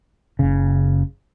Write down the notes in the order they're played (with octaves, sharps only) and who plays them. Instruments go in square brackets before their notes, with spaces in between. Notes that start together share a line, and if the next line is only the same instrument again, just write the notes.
[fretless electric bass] F#1 C#3